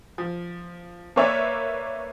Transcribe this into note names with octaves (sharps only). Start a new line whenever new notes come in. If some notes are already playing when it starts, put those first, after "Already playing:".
F3
A#3 A#4 B4 C#5 D5 E5